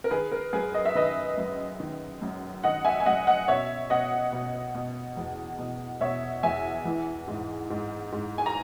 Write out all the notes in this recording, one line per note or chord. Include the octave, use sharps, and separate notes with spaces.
A#4
D#3 G#4 B4
A#4
F#2 G#4 B4
D#5
E5
D#3 B4 D#5
F#2
D#3
F#2
D#3 D#5 F#5
E5 G#5
G#5
F#2 D#5 F#5
D#5 F#5
B2 C#5 E5
B2 D#5 F#5
B2
B2
E2
B2
B2 C#5 E5
E2 E5 G#5
E3
G#2
G#2
G#2
G#5
A#5